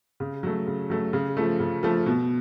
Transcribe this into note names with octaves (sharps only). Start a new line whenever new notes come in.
C#3
F#3 A3
C#3
F#3 A3
C#3
F3 A3
C#3
F3 A3
B2